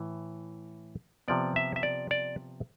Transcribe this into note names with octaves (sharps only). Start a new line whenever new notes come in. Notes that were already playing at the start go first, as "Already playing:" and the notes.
Already playing: A2 E3
C3 F3 B3 D5
E5
E5
D5
D5